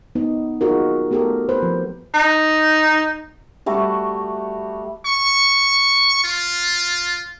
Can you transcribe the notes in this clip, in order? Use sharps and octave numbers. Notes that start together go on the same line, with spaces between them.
B3 D#4
D#4 F4 F#4 G#4 A#4
A3 B3 G4 A4 A#4
B4 C5
F3
D#4
G3 A3 F#4
C#6
F4